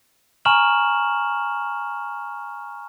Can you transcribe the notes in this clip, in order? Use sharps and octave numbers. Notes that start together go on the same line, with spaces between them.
G#5 A#5 C#6 F6 E7 F#7